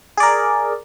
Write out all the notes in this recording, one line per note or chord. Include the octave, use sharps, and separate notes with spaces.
G#4 A#4 D5